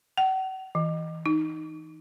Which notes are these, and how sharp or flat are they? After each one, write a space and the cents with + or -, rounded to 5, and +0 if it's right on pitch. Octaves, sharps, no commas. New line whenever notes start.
F#5 +40
E3 -20
D#4 +0